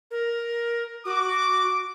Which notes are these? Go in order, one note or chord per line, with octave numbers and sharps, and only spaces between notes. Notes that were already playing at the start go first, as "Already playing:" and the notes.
A#4
F#4 D6